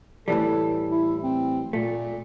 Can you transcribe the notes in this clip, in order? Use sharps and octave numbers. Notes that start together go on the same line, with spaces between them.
A2 E3 G3 A4
E4
C4
A#2 A3